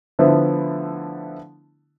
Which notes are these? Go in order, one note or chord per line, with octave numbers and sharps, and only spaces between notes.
D3 F3 A3 B3 E4